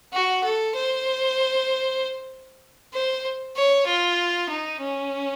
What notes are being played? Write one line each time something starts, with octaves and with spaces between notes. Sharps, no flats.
F#4
A4
C5
C5
C#5
F4
D#4
C#4